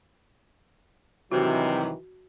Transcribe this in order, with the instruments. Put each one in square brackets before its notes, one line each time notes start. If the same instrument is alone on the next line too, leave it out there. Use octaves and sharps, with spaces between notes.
[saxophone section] G2 C3 [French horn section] D#3 E3 F#3 [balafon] F#4